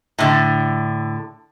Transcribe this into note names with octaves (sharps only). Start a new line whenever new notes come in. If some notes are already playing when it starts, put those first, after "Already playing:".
A2 D3